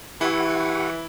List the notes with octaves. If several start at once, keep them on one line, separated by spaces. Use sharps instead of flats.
E3 E4 G4 F#5 C#6